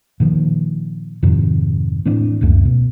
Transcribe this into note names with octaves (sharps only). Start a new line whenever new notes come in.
A#2 D#3 F3
F2 G#2 C3 D#3
A2 E3 C4 D4
D1 C#2 F#2 A3
B2